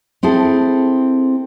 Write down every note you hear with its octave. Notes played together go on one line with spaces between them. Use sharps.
C4 E4 G#4 A4